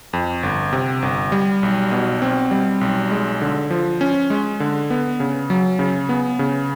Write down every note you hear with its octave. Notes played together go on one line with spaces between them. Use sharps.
F2
G1
C3
G1
G3
B1
B2
C4
G3
B1
G#3
D3
F3
C#4
G#3
D3
B3
C#3
F#3
C#3
B3
C#3